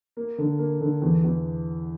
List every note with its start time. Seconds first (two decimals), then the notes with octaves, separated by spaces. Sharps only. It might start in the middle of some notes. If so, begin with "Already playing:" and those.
0.17 A#3
0.38 D3
0.59 A#3
0.81 D3
1.02 E2
1.24 E2